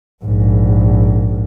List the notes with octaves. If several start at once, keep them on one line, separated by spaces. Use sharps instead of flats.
A#1 G#2